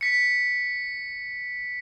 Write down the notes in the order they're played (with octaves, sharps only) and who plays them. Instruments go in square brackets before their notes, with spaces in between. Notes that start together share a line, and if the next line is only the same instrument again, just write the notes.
[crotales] B6 C#7